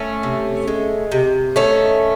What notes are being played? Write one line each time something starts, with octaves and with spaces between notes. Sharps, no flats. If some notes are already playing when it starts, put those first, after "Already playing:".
Already playing: A3 C#4
C3
G#3
C3
D#3 A3 C#4